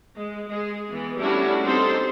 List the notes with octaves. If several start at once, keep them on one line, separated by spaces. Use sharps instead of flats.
G#3
G#3 G#4
E3 B3
G3 A3 C#4 D4 E4 F#4
C4 D#4 G4 A4 C5